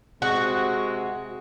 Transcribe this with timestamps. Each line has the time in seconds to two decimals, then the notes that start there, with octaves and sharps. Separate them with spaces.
0.22 C3 G#3 F#4